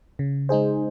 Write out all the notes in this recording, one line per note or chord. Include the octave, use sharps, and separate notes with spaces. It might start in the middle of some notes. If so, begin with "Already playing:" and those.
C#3
G#3 D#4 G#4 C5